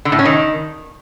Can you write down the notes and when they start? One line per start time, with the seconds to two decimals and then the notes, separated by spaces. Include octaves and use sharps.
0.05 D3
0.12 A2
0.19 C#4
0.25 D#3